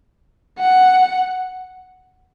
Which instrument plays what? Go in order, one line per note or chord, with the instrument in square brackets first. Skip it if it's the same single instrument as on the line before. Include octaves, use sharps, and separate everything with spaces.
[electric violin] F#5